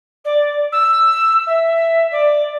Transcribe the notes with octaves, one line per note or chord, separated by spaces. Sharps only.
D5
E6
E5
D5